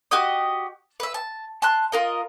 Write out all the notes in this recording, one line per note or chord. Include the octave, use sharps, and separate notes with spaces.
F#4 G4 D#5 D#6
B4 E5
A5
A5 C6 F#6
F4 A#4 D#5